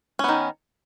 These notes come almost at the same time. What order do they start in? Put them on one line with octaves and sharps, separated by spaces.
C#4 B3 D#3